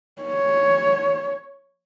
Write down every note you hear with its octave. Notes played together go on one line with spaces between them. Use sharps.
C#5